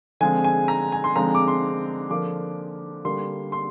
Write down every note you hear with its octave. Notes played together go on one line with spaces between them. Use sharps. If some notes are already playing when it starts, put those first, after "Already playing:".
D3 F3 G#3 C4 G#5
G#5
A#5
G#5
C6
D3 F3 G#3 C4 A#5
D6
C6
D3 F3 A#3 D6
D3 G3 A#3 C6
C6